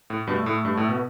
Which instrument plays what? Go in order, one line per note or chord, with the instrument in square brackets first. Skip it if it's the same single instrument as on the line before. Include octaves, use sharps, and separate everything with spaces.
[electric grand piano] A2
[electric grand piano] G2 B2 [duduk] A3
[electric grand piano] A2
G2
A2
B2
[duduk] B3